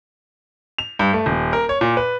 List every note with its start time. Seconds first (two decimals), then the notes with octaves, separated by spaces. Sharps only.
0.78 F7
0.99 G2
1.13 A3
1.26 D#1
1.53 A#4
1.69 C#5
1.81 A#2
1.97 B4